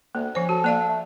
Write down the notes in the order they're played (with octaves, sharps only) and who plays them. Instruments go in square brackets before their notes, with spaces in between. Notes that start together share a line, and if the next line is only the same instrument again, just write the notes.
[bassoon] D2 [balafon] A#3
[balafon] F3 C5 [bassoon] C#4
[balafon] F#4 [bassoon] A4
[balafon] A#3 D5 F5
[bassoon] A3